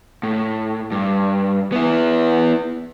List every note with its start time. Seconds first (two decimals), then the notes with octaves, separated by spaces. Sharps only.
0.23 A2
0.92 G2
1.72 B3 E4